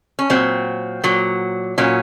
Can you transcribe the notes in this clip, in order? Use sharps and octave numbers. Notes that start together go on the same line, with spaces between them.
C#4
A#2 F#3 C4
A#2 F#3
A#2 F#3 C#4